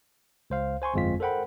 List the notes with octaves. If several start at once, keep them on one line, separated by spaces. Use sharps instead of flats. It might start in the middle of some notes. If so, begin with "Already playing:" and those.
C#2 C5 F5
C5 G#5 C6 C#6
G1 F2 G#3 C4 F4 B6
A4 A#4 C5 F#5 G5 B5